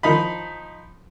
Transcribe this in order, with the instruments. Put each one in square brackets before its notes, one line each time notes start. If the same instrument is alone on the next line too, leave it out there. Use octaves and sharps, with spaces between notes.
[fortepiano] F3 D#4 B5